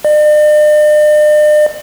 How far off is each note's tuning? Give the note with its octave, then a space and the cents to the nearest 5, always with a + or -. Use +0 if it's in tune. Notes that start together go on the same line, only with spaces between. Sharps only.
D5 +45